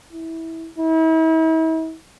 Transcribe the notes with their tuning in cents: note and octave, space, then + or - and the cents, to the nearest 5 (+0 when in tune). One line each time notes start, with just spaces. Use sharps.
E4 -15
E4 -40